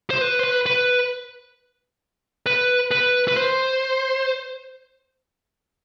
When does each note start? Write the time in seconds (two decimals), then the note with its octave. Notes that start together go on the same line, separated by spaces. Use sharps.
0.10 C5
0.21 B4
0.39 C5
0.43 B4
0.66 B4
2.46 B4
2.91 B4
3.28 B4
3.36 C5